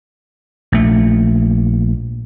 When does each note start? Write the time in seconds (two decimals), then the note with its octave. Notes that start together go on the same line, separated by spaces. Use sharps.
0.72 A#1 A3